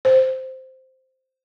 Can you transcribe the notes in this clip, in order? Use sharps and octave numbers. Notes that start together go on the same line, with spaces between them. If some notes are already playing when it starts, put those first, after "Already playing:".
C5